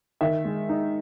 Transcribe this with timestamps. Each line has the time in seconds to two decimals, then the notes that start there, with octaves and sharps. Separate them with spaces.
0.21 D#3 E5
0.45 G#3
0.69 D#4